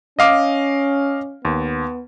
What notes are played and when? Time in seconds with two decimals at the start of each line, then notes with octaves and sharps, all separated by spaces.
0.19 C#4 D#5 F5 D6
1.45 D#2 B3